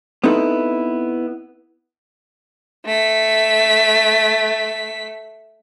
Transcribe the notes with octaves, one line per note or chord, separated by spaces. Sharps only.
B3 C4 D#4 E4 A4 B4
A3 B6